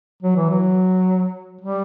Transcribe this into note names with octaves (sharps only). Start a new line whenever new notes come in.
F#3
E3
F#3
G3